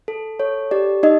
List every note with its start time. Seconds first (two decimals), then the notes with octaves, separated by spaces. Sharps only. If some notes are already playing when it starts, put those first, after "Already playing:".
0.08 A4
0.40 A4 C#5
0.71 G4 D5
1.03 D#4 D#5